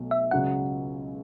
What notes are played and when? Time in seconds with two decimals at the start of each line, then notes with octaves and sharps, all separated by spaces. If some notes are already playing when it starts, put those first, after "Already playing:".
Already playing: B1 B2 F#3 A3
0.11 E5
0.31 C#2 C#3 F#3 F#5